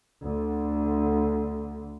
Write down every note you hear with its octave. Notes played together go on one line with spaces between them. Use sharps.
D2 D3